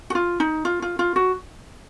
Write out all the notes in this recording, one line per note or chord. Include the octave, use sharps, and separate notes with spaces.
F#4
F4
D#4
F4
F4
F4
F#4